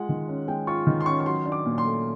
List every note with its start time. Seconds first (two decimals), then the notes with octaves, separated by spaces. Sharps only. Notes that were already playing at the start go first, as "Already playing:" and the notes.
Already playing: G#3 F4 F#5
0.09 D#3
0.28 C#4
0.48 G#3 G5
0.67 F4 C#6
0.87 D#3
1.01 C6
1.06 C#4 C#6
1.20 C#6
1.26 F#3 C6
1.45 D4
1.52 D6
1.66 A#2
1.78 C6
1.85 A3